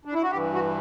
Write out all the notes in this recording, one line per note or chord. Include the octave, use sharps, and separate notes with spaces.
D4
E4
F#4
G2 E3 G4
F#4